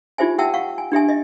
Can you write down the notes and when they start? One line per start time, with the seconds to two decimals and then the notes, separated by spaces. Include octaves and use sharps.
0.18 D#4 F4 G4 C5 E5 G#5
0.38 G4 E5 F#5 G5 A5 E6
0.54 F5 F#5 C#6
0.78 G#5
0.92 D4 G4 E5 G#5
1.09 D#5 E5